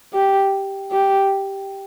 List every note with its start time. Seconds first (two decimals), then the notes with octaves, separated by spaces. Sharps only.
0.14 G4
0.92 G4